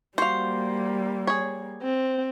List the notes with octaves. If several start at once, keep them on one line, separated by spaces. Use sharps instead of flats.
G3 A#3 F#4 C5 F5
G#4 C#5
C4